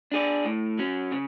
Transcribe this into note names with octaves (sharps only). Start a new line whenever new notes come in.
D4 G#4 D5
A2
F#3 C#4
C#3